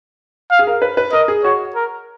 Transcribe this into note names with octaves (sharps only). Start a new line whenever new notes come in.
F5
G#4
A#4
B4
B4
A#4 D#5
G#4
F#4 C#5
A#4